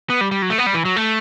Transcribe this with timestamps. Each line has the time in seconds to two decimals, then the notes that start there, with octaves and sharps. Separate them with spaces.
0.10 B3
0.21 G3
0.31 G3
0.42 F#3
0.50 A3
0.58 B3
0.66 G3
0.74 E3
0.85 F#3
0.96 A3